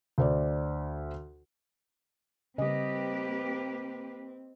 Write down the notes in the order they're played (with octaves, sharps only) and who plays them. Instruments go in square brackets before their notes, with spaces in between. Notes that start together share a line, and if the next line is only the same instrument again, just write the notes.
[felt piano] D2 C5 D5
[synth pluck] C#3 G3 [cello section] A#3 G4 B4 [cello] C4 [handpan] D#5